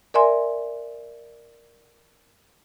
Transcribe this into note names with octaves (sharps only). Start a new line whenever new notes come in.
A#4 D5 E5 G#5 C6